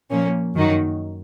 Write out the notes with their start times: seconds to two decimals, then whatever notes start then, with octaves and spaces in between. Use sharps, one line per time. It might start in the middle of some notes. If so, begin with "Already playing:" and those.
0.10 A#2 F3 A#3 C#4
0.55 F#2 D#3 A#3 D#4 F#4